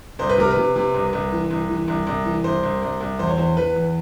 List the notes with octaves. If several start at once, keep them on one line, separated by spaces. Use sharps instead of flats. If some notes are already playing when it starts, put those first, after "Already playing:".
C2 C5
B4
C3 A#4
B4
C3
C3
C2
C2
E3
C2
E3
C2
C2
E3
C2 C5
C2
C2
C2
E2 C5
C#5
E2 C5
E2 B4
E2